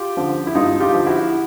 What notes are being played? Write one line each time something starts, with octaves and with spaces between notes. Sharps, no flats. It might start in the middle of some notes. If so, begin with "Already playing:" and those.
Already playing: F4 G4
D3 F3
E4
G2 D#4 F4
F4 G4
D3 F3
E4 F#4